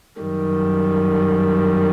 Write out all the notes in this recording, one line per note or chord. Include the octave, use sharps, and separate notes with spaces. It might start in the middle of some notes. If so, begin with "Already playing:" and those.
F#2 D#3 G3